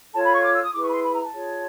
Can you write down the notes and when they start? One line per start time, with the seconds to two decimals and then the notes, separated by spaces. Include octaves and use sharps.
0.13 F4 A4 C#5 A5
0.23 B5
0.34 C#6
0.43 D6
0.53 E6
0.63 D#6
0.73 E4 G#4 B4 D6
0.83 C#6
0.87 B5
0.92 C6
1.03 B5
1.12 A#5
1.22 A5
1.33 F4 G#4 C#5